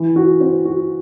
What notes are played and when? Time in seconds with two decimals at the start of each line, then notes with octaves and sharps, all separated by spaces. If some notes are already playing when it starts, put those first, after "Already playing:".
Already playing: E3
0.16 F#4
0.41 C4
0.65 F#4